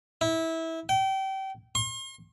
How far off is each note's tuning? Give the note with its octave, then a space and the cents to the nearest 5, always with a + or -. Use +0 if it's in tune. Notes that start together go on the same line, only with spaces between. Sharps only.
E4 -20
G5 -30
C6 +45